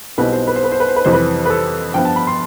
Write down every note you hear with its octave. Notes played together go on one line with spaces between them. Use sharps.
B1 B2 G3 C4 E4 B4
C5
B4
C5
B4
C5
B4
C5
B4
F2 C3 E3 G3 C5
B4
B4
A4
G2 F3 B3 G5
A5
B5
C6